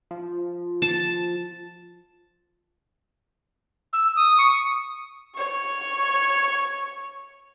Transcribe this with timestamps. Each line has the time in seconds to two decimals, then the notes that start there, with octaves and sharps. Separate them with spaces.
0.11 F3
0.82 A5
3.93 E6
4.16 D#6
4.38 C#6
5.36 C#5 C#6